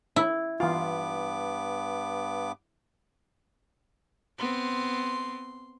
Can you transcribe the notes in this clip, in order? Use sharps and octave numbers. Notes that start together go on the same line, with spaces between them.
E4
G2 E3 B3 F4 D6
B3 C4 C6